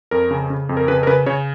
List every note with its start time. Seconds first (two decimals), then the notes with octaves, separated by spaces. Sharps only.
0.11 F2 A#4
0.31 C#3
0.50 C#3
0.69 F2
0.77 A#4
0.88 C#3 B4
1.03 A#4
1.07 C#3 B4
1.26 C#3 C#5